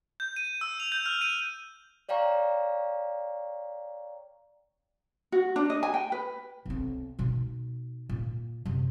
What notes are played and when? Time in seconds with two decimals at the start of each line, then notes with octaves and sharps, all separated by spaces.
0.20 G6
0.36 D#7
0.61 E6
0.80 F7
0.92 G6
1.06 F6
1.21 D#7
2.09 C#5 D5 F5 G5 A#5 C#6
5.32 F#4
5.56 D4
5.70 D#5
5.83 G#5
5.94 G5
6.12 B4
6.65 B1 C4
7.19 B2 D#4
8.09 A#2
8.65 F#2 C3